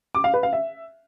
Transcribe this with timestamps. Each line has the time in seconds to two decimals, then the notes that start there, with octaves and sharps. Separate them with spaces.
0.15 D6
0.24 F5
0.34 B4
0.43 F5
0.53 E5